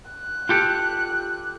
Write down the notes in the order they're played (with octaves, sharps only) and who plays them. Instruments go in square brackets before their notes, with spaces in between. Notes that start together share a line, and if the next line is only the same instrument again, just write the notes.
[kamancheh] F#6
[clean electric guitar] F4 G4 A4